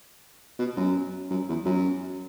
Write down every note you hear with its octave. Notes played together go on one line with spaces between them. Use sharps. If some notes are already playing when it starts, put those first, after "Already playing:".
B2
F#2
F#2
E2
F#2